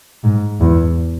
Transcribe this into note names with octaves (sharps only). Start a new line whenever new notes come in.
G#2
E2